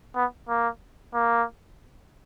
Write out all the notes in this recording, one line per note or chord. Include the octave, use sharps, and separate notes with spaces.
B3
A#3
A#3